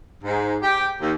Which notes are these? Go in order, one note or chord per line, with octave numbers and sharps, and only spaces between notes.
G#2
G4
D#2